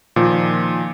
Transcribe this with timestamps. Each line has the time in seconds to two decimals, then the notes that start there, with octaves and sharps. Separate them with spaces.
0.16 A#2 D#3 F3